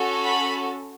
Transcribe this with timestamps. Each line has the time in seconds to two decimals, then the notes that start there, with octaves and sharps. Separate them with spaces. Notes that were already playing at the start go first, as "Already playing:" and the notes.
Already playing: C#4 F#4 A4
0.23 B5